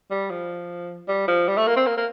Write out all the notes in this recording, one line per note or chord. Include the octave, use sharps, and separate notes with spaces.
G3
F3
G3
F3
G3
A3
A#3
C4
A#3
A#3